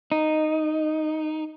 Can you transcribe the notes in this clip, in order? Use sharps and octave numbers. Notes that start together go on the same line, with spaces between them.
D#4